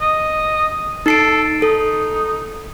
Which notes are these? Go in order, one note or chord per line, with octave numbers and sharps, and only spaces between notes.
D#5
D#4 A4 C7 D7
D#4 A4